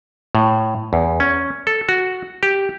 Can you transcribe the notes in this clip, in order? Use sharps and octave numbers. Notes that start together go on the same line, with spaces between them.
A2
E2
C#4
A4
F#4
G4